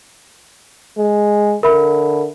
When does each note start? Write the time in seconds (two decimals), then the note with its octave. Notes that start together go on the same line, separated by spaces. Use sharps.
0.98 G#3
1.63 D3 A#4 E5 B5